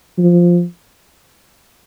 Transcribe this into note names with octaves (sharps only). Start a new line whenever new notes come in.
F3